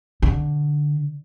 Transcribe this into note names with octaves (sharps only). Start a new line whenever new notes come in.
D3